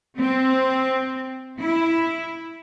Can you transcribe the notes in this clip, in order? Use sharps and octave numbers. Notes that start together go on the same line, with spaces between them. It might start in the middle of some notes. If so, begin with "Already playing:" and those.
C4
E4